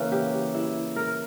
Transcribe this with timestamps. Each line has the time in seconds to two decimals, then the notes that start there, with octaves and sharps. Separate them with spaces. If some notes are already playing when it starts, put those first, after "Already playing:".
Already playing: C#3 E3 A#3 C#4 E5
0.12 G4
0.54 E4
0.96 A#4